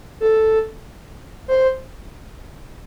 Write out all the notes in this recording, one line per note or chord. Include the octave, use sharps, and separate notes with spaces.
A4
C5